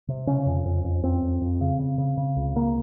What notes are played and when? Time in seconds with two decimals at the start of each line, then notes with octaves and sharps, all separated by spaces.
0.08 C3
0.27 C#3 C#4
0.46 F2
0.65 F2
0.85 F2
1.04 F2 C4
1.23 F2
1.41 F2
1.61 C#3
1.79 C#3
1.98 C#3
2.18 C#3
2.37 C#2
2.56 C#3 A#3